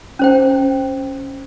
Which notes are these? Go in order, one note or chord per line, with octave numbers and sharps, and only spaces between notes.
C#4 C5 G5